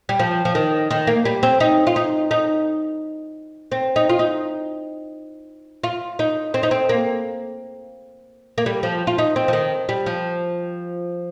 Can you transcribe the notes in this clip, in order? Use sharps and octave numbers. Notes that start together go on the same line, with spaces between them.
G3
F3
F3
D#3
D#3
A#3
G3
C4
D#4
F4
D#4
D#4
C4
D#4
F4
D#4
F4
D#4
C4
D#4
C4
A#3
A#3
G3
F3
F4
D#4
C4
F3
D#3
G3
F3